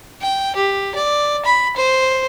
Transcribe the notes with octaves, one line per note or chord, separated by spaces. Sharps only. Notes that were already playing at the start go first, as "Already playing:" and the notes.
G5
G4
D5
B5
C5